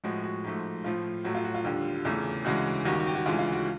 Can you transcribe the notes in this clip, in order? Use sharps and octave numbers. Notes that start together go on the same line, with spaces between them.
A2 F3 G#3 F#4
F#4
G#2 F3 A3
A2 F3 A3 F4
A2 F#3 A3 F#4
F4
F#4
F4
D#2 D3 G3
E2 C#3 E3 A3
D2 C#3 E3 G#3 F#4
D#2 D#3 G3 F#4
G4
F#4
G4
F#4
D2 C#3 E3 G#3 F4
F4
F#4